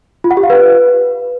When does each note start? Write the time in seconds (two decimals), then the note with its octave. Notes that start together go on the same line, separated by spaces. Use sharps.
0.24 F4
0.31 F#5
0.37 G4
0.43 F5
0.50 B4